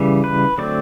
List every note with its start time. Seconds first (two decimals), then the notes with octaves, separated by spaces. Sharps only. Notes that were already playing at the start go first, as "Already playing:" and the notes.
Already playing: C#3 E3 G3
0.24 B4
0.58 D3 F#3 A3 C4 D5